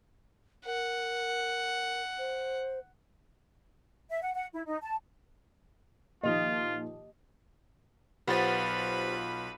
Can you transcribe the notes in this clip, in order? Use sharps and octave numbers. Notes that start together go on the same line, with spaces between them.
A#4 F#5
C5
E5
F#5
F#5
E4
D#4
A5
A#2 D#3 F3 F4 G4 D#5
B1 B3 F4 G4 B4 C5 B5 A6